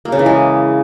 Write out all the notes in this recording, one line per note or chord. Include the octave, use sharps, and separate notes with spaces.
A#3
C#3
E3
G#3